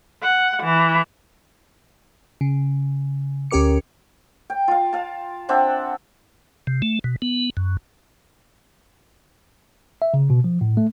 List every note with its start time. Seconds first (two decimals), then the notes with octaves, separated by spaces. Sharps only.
0.22 F#5
0.64 E3
2.41 C#3
3.51 D2 C#4 G4 A#4 D6 C#7
4.50 G5
4.68 F4 F5
4.93 F5 A5
5.49 C4 D4 E5 F#5
6.67 C3
6.82 A3
7.04 B2
7.22 B3
7.57 F#2
10.02 E5
10.14 C#3
10.30 B2
10.44 F3
10.61 A2
10.77 A3